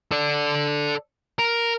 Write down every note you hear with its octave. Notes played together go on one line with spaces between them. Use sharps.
A4 D5
A#4